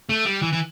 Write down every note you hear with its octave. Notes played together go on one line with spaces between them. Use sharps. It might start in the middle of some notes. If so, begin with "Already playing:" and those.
A3
G3
E3
E3